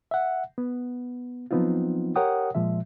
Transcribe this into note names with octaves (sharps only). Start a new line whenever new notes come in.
E5 F#5
B3
F3 F#3 B3 C4 D#4 F4
G4 A#4 C#5 F#5 G5 D#6
A#2 F3 G#3 E5